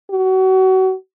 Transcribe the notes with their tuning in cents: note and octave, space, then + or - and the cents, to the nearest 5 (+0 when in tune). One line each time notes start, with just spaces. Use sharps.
F#4 +30